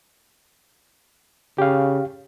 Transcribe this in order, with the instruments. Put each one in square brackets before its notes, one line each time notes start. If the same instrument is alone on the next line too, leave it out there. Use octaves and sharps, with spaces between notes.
[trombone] C#3 [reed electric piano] G4 F5